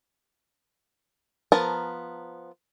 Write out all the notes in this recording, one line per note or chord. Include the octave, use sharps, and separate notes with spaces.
F3 B3 A#4 A5